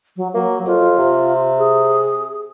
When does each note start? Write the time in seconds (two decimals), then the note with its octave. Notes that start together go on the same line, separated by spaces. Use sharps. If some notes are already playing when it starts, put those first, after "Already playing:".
0.17 F#3
0.34 F#3 A#3
0.67 F2 F4
0.98 C3
1.58 G#4